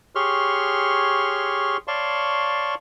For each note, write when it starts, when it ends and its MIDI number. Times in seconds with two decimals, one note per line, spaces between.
0.15 1.77 67
0.15 1.77 68
0.15 1.77 73
0.15 1.77 84
0.15 1.77 85
0.15 1.77 89
1.88 2.75 73
1.88 2.75 74
1.88 2.75 77
1.88 2.75 81
1.88 2.75 84
1.88 2.75 85